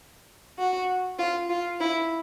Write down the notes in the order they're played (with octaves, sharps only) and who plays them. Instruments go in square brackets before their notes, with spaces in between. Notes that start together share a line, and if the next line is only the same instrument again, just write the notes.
[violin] F#4
F4
F4
E4